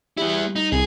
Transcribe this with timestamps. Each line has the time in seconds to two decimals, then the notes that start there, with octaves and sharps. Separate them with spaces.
0.17 G3 B3 E4
0.56 D#4
0.72 C2 G#4